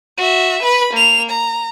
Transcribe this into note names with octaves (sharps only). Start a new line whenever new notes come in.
F#4 E5
B4 B5
A#3 F7
A#5